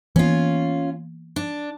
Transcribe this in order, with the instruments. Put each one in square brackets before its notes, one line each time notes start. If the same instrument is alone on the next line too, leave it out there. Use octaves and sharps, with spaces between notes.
[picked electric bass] E3 A#3 B3 [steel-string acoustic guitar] C#4 F4
[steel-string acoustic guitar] D4